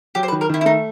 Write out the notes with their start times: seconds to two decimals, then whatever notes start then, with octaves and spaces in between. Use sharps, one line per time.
0.15 F#3 G4
0.23 C5
0.28 B4
0.32 D#3
0.41 A#4
0.49 D#3 E4
0.61 E4
0.65 A3 D#4